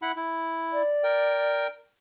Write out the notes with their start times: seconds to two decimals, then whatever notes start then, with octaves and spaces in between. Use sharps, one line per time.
0.02 E4 F#5 B5
0.17 E4
0.73 D5
1.04 A#4 G5